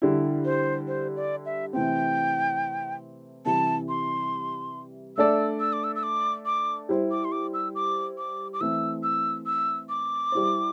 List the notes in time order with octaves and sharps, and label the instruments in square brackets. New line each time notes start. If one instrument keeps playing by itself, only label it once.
[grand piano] D3 G3 E4
[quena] C5
C5
D5
E5
[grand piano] C3 E3 A3 C4 [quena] G5
[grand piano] C3 E3 G3 [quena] A5
[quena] C6
[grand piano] A3 D4 A4 D5 [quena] E6
[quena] E6
D6
E6
E6
D6
D6
[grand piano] G3 E4 C5
[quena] D6
C6
D6
E6
D6
D6
D6
[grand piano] E3 A3 C4 [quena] E6
[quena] E6
E6
D6
[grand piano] G3 E4 C5